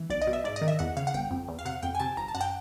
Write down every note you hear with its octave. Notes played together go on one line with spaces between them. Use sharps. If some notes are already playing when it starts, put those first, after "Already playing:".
Already playing: E3
B1 D5
D#5
B2
E5
G#2 D5
D#5
D#3
E5
E2 F#5
C#3 F5
F#5
G1 G5
F2
E2
F5
C3 F#5
F2 G5
G#5
C3 A5
G1 A#5
A5
F#2 F#5
G5